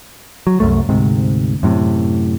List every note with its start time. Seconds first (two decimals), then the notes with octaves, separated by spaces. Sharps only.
0.47 F#3
0.60 C2 F#2 A3
0.89 D2 G#2 C3
1.63 F#2 A2 C3